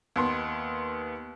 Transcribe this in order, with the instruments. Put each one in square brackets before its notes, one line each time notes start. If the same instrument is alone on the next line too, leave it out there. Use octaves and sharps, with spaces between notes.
[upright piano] D#2 B3 C6